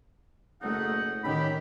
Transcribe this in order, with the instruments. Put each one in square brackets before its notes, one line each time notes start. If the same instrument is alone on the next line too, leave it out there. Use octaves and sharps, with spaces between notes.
[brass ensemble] F#1 F#5 [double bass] A3 [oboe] D#4
[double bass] A2 D#3 [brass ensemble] C#4 D#4 G4 [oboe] B5